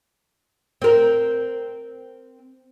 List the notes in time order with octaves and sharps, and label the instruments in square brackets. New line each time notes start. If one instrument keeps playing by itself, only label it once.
[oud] C4 A#4